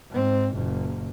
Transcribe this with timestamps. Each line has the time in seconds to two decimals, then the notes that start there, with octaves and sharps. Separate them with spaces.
0.11 G#2 C4
0.54 F#1 A#2